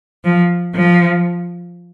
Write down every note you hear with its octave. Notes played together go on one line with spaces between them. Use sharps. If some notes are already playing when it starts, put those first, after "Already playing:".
F3
F3